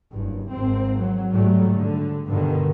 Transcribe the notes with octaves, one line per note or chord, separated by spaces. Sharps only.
F#1 G2
G#1 C4
F#3
G#2 F#3 G3 A3
D3
G2 B2 D3 D#3